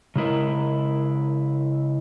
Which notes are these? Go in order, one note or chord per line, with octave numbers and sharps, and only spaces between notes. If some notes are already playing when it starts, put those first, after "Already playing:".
C#3 G#3 E4 A#4